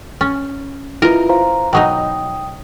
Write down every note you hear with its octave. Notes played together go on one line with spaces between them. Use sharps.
C#4
E4 F4 A#4 B4 D#5
C5 F5 A#5
B2 F#3 D#4 G5 D#6